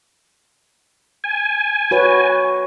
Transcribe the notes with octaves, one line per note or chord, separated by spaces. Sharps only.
G#5
F#4 B4 C#5